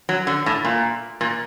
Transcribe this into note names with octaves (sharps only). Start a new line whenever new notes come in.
F#3
D3
A2
A#2
A#2